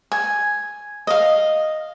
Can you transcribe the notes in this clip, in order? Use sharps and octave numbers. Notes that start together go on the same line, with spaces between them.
G#5
D#5 F5